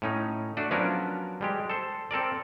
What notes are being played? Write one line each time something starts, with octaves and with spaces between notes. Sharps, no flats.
A2 C#4 D#4
A3 D4 F#4
F3 F#3 B3 C#4 D4 A#4
G3 G#3 G4
A4 C5
C4 A4 A#4 D5